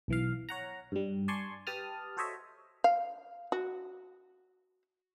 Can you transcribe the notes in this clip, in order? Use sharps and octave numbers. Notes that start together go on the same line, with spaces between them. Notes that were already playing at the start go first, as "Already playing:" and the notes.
B1 E3 F5
C#5 F#5 A#5
G2 G3
D5 G#5 A5 C6 C#6
G4 B4 A5 D#6 F6
F#4 A4 C5 C#5 D#5 E5
F5
F#4